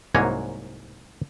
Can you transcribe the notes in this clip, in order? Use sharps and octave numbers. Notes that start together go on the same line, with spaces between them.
C2 G#2 F#3 A#3 C#5 G#5